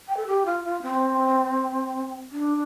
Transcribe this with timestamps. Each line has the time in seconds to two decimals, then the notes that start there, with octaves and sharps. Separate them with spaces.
0.08 G5
0.17 A4
0.27 G4
0.46 F4
0.64 F4
0.82 C4
2.31 D4